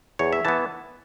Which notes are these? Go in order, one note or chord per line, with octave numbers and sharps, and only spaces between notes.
E2 C#5
E5
E3 B3 A5